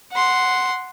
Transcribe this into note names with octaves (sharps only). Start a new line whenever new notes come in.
F#5 C6